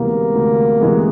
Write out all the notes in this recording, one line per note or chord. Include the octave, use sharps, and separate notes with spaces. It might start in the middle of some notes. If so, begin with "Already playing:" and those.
Already playing: D2 C3 E3 G#3 A#3 B3
D2
C3 E3 G#3 B3